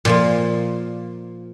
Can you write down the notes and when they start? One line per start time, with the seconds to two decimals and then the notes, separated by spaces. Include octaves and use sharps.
0.05 A#2 F3 A#3